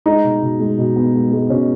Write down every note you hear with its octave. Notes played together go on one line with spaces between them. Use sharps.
G#3 D#4
B2
B2
G#3
B2
B3
G#3
G#3
B2 C#4